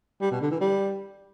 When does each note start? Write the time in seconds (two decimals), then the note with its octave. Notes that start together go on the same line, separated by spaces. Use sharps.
0.21 G3
0.31 B2
0.41 D3
0.51 E3
0.61 G3